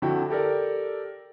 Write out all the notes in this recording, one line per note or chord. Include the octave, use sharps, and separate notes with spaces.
F2 D3 E4 F#4 G5
G4 A4 A#4 D5